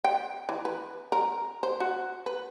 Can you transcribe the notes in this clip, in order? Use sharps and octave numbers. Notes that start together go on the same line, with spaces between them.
G5
E3
B4
A#4
C5
F#4
B4